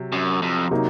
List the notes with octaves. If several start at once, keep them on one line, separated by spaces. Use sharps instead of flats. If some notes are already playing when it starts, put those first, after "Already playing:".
Already playing: C3 F#3
F#2
F2
C3 F#3 A#3 D#4